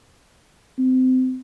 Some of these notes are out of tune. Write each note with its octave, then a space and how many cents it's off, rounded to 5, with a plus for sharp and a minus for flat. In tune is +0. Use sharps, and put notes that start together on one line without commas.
C4 -30